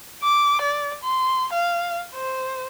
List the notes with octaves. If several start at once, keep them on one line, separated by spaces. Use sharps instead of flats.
D6
D5
C6
F5
C5